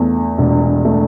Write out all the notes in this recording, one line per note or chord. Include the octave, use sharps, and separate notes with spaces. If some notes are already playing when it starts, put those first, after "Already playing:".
Already playing: E2 A3
E1
A3